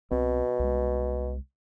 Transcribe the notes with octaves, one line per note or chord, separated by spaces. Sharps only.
C2 B2 C4
C2 G#3